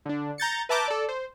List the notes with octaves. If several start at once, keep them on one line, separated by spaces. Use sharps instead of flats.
D3 D4
A#5 G6 A6 C#7
B4 E5 A5 A#5 D6 G6
A4 D5
C5